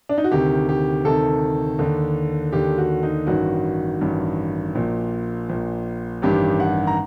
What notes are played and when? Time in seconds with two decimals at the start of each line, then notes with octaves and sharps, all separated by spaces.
0.09 D4
0.18 D#4
0.24 F#4
0.31 D2 C3 D#3 G4
0.69 G4
1.05 D2 C3 D#3 A4
1.79 D#2 D3
2.53 D#2 D3 G4
2.78 F#4
3.03 D#4
3.27 A1 G2 D#3 F#4
4.01 A1 G2 D#3
4.75 A#1 A#2
5.49 A#1 A#2
6.22 A1 G2 D#3 G4
6.60 F#5
6.87 A#5